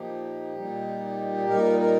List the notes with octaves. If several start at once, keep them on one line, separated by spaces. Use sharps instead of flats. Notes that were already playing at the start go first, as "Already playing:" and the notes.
Already playing: A#2 F3 D#4 G4
A#2 G3 D#4
A#2 G3 D#4 A#4
A#4